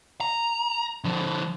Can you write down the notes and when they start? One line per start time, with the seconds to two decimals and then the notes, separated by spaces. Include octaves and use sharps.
0.21 A#5
1.04 D3 F3